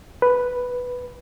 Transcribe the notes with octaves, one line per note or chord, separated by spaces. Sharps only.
B4